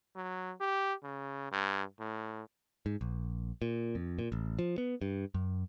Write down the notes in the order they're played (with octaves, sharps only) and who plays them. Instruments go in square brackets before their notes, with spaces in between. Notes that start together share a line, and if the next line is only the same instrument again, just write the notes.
[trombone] F#3
G4
C#3
G2
A2
[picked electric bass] G#2
A#1
A#2
F2
A#2
A1
F3
B3
G2
F#2